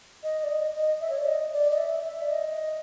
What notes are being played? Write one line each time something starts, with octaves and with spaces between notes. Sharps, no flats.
D#5
D5
D#5
D#5
E5
C#5
D5
D#5
D5
D#5
E5
E5
D5
D#5